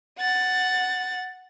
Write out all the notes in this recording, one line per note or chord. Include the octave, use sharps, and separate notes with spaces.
F#5 A6